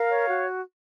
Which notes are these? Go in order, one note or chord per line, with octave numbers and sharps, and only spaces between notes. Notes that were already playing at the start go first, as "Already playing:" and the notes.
Already playing: A#4 F5
C#5
F#4